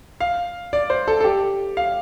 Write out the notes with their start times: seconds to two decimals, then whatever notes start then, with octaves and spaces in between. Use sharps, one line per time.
0.20 F5
0.73 D5
0.90 C5
1.08 A4
1.21 A4
1.24 G4
1.77 F5